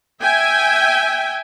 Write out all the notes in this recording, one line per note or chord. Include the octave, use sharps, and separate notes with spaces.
E5 G5 G#5